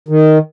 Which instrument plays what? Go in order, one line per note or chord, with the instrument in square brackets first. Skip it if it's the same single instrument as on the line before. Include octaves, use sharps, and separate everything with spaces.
[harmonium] D#3